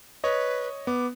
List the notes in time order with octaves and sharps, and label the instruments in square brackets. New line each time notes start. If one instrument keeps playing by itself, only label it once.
[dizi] B4 [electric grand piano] C#5 D#5
[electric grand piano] B3 [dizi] D6